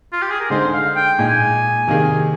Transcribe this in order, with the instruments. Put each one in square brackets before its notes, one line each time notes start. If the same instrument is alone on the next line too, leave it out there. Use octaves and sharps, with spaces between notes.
[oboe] F4
G4
G#4
A#4
[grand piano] D3 G#3 D#4 G#4 [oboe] C5
[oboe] F5
G5
[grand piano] A#2 G#3 D#4 [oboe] G#5
[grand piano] C3 D#3 A#3 D#4 G#4